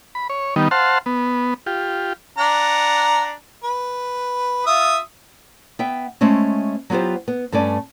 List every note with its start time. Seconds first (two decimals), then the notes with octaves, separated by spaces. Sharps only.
0.15 B5
0.30 C#5
0.56 D#3 G3 B3 D#4
0.71 C5 F5 F#5 A5 C6
1.06 B3
1.66 F4 G4
2.38 D4 F#5 A#5
3.64 B4
4.66 F4 E5 D#6
5.79 B3 E5 G5
6.21 G#3 A3 C4 C#4
6.90 F#3 B3 F4 G4 C5
7.28 B3
7.52 G2 A3 C#4 D5 G#5